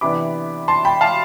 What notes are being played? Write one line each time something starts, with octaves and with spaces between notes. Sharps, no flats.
C3 E3 B3 D4 B5 D6
A5 C6
G5 B5
F5 A5